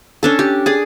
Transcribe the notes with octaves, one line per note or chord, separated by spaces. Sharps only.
C#4 D4 A4
G4
G#4 D5